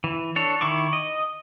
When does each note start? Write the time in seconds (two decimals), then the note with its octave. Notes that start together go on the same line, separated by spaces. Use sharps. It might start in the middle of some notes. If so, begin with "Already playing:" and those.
0.04 E3
0.36 D4 A4 C#5
0.61 D#3 E4 C#6 D6
0.93 D#5